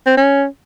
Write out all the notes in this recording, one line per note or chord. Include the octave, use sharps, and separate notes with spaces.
C4
C#4